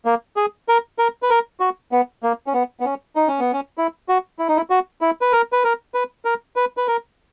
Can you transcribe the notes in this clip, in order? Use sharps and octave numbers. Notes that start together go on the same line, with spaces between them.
A#3
G#4
A#4
A#4
B4
A#4
F#4
B3
A#3
C#4
B3
B3
C#4
D#4
C#4
B3
C#4
E4
F#4
E4
D#4
E4
F#4
E4
B4
A#4
B4
A#4
B4
A#4
B4
B4
A#4